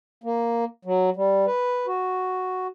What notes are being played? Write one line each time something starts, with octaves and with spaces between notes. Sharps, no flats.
A#3
F#3
G3
B4
F#4